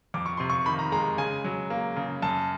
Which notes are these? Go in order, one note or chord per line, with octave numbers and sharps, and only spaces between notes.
F2 D6
C#6
C3 C6
C#6
D#3 B5
A#5
G#3 A#5
C#3 G#5
F#3
A#3
C#3
F#2 A5